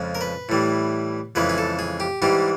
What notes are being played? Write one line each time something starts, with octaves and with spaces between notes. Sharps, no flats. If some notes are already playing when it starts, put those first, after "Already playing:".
Already playing: F2 C#3 F3 G#3
A#4
B4
A2 E3 G3
F2 C#3 E3 G#3 B4
G#4
A4
G#4
G4
G#2 E3 G3 G4